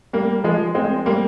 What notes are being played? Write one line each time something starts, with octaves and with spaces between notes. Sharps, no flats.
G3 A#3
F3 G#3
G#3 C4
G3 A#3